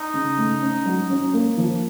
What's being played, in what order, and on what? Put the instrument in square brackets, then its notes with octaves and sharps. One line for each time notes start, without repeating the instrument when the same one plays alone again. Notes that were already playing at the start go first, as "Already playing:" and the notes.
Already playing: [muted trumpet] D#4
[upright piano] C#3
A3
C#4
F#3
C#4
A#3
F3